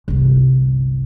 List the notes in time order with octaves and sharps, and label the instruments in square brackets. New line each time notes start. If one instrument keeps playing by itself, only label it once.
[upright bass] G1 C2